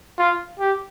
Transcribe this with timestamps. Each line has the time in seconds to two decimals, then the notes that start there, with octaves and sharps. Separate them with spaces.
0.18 F4
0.59 G4